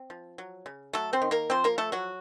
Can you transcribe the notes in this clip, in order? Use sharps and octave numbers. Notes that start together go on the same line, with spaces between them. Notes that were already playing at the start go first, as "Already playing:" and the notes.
Already playing: C4
F3
F#3
C#3
F#3 A3 A4
C4 C5
D#3
A#3 A#4
F3 C4 C5
A#3 A#4
F3 A3 A4
F#3 F#4